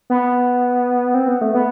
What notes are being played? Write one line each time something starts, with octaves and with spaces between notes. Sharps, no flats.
B3
C4
B3
A3
B3